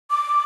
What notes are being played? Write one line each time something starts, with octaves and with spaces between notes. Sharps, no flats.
D6